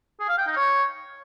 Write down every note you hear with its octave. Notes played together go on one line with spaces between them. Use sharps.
G#4
F5
G5
D#4
C#5